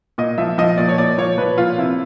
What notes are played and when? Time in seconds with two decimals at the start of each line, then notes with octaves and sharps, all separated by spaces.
0.18 A#2 D#5
0.38 F3 E5
0.58 F3 D#5
0.77 A#2 D5
0.89 C#5
0.98 A#2 D5
1.18 F3 C#5
1.38 F3 B4
1.58 A#2 F4
1.78 C3 E4